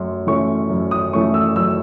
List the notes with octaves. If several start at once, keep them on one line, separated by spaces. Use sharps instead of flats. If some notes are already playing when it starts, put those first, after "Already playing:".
Already playing: F#2 A3 C6
E3 A3 C#4 C#6
F#2
D#6
E3 A3 C#4 C#6
E6
F#2 E6